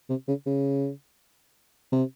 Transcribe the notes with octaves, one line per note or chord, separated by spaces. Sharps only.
C3
C#3
C#3
C3